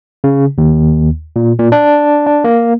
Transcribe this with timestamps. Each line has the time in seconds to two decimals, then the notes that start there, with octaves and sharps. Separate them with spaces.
0.24 C#3
0.58 D#2
1.36 A#2
1.59 A#2
1.72 D4
2.26 D4
2.44 A#3